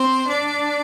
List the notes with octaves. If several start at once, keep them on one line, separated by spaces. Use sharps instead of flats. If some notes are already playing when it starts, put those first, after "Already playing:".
Already playing: C4 C5
D4 D5